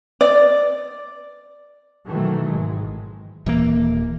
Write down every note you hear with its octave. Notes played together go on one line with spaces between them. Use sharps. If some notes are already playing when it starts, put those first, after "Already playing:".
D5
B2 D#3 E3 F#3 A3
G#1 G#3
D#1 E3 A#3